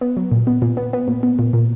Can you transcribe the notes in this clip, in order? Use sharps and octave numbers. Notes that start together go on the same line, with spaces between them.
B3
F#3
A#2
B3
A#2
B3
B3
A#2
B3
A#2
A#2